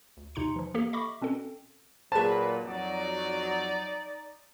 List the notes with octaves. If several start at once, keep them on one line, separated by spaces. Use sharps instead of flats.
D2
E2 C3 D#4 A#5 C6 C#7
E3 F3
A#3 G4 A4
D#5 E5 B5 C#6 D6
B2 C4 C#4 A4
A#2 F#3 G#4 B4 C5 A5
F2 F#3 D#4 D5